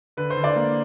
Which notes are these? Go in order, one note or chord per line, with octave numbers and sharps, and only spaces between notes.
D3 B4
C5
D3
D5
A#3